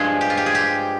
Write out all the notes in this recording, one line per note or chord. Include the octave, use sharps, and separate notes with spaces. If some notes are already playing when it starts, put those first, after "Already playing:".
Already playing: G2 F3 G#3 G#4
G4
F4
G4
G#4
G4